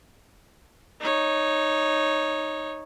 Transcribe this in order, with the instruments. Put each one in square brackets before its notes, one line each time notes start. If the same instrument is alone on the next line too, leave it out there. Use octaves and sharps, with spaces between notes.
[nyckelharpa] D#4 C#5